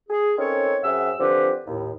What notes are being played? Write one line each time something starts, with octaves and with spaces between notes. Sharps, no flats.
G#4
C4 C#4 D#4 A4 A#4 C#5
F#2 C4 G#4 E5 F#5 E6
D3 F3 C4 F4 G4 B4
D#2 A2